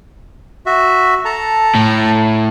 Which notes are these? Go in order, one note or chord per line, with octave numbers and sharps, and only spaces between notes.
F#4 E5
A4 A5 A#5
A2